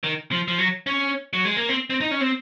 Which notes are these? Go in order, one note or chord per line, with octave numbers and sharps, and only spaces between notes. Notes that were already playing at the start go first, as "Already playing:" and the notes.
D#3
F3
F3
F#3
C#4
F#3
G#3
A#3
C4
C4
D#4
C#4
C4